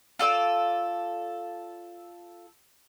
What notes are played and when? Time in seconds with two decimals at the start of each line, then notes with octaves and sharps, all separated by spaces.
0.19 F4 A4 D5 E6